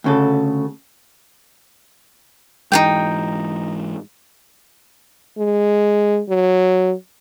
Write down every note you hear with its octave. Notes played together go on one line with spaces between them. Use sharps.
D2 C#3 A4
G#2 E3 G#3 D#4 F4 G5
G#3
F#3